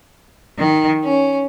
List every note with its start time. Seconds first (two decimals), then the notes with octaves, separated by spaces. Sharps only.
0.57 D#3
1.03 C#4